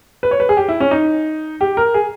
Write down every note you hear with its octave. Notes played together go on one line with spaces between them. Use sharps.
B4
C#5
B4
G#4
G4
E4
C#4
D#4
G4
A#4
G#4